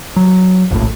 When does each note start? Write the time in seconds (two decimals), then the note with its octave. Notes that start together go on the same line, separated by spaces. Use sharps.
0.16 F#3
0.71 F1 A#1 A2